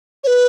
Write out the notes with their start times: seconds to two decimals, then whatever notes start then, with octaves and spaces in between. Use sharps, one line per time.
0.24 C#5
0.27 B4